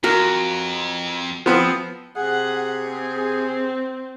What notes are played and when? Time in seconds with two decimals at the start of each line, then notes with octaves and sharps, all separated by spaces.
0.04 F2 F#4 A#4
1.46 F3 B3 C4
2.17 C3 G#4 F#5
2.87 C4